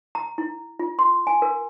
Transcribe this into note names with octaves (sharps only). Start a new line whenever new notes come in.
A#5
E4
F4
C6
G#5
A#4